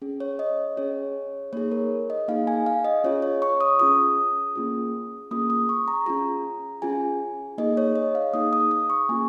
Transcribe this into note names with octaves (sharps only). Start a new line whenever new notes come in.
C#4 G#4
C#5
D#5
C#4 G#4 C#5
A#3 D#4 G#4 C#5
A#4
D#5
A#3 D#4 G#4 F5
G#5
F5
D#5
C#4 F4 G#4 C#5
C#5
C#6
D#6
C#4 F4 G#4 D#6
A#3 C#4 F4 G#4
A#3 C#4 F4 G#4 D#6
D#6
C#6
A#5
C#4 F4 G#4 A#5
C#4 F4 G#4 G#5
A#3 D#4 G#4 D#5
C#5
D#5
F5
A#3 D#4 G#4 D#6
D#6
D#6
C#6
A#3 C#4 F4 G#4 G#5